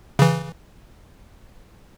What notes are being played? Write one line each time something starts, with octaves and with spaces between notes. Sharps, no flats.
C#3 E3